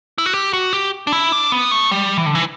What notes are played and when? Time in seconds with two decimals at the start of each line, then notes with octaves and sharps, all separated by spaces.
0.18 E4
0.26 F#4
0.34 G4
0.53 F#4
0.73 G4
1.07 D4
1.13 E4
1.32 D4
1.52 B3
1.71 A3
1.91 G3
2.17 E3
2.26 D3
2.35 E3